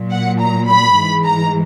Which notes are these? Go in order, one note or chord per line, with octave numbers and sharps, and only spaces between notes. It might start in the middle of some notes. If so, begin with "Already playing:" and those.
Already playing: A#2 F#3
F#5
A#5
B5
G#2 E3 G#3
A#5